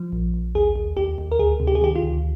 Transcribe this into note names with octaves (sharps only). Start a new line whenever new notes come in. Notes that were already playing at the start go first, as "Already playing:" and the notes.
Already playing: F3
A#1
A#1
D#2 G#4
D#2
D#2 G4
D#2
A#4
D2 G#4
C3
G4
G#4
D#3 G4
F4
D2